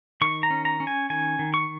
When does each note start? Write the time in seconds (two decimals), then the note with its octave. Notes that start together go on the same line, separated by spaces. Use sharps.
0.21 D#3 C#6
0.43 A#5
0.50 C#4
0.65 A#5
0.80 C#4
0.87 G#5
1.10 D#3 G#5
1.39 D#3
1.54 C#6